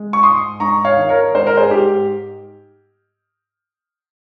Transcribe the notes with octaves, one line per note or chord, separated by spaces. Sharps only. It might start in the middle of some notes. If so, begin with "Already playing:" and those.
Already playing: G#3
C#6
G#2 C6 D#6
G#2 A#5 C#6
C#5 F5
D#3
A#4 C#5
G#2 C5
A#4
G#4 C5
G#2 G4